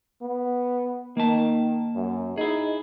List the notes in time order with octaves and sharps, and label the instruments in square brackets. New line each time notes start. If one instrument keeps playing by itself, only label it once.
[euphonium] B3
[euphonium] D#3 [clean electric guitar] A#3 A5
[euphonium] F#2
[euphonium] D#4 [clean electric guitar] E4 G#4